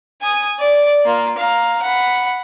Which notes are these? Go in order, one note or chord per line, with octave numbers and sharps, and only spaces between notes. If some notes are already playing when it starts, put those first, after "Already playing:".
G#5 D#6
D5
A#3 F4
F5 A#5
F#5 B5